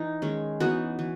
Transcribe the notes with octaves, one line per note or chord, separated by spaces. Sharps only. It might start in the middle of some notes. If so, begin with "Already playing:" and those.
Already playing: E3 D#4
D#3 G#3 C#4
E3 B3 D#4 F#4
E3